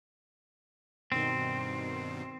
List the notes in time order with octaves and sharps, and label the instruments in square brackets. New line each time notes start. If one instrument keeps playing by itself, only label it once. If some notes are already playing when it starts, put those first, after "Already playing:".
[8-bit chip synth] G2 B2 D#3 [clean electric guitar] C4